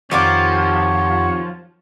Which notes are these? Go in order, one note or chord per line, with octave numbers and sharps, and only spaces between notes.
F2 D#3 F3 F4 G4 C#5 F#5